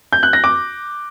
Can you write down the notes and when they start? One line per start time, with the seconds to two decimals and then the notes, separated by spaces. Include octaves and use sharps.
0.13 G6
0.23 F#6
0.33 A#6
0.44 D6